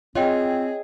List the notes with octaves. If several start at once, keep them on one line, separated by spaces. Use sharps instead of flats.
C4 F4 G#4 C#5 D#5 G5